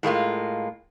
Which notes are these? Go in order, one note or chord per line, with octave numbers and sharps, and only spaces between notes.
A2 G#3 A#3 F4